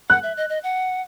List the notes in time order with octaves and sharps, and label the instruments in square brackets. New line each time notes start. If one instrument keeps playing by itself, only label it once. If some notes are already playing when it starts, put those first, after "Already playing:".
[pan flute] F#5 [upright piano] F#6
[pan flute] E5
D#5
D#5
F#5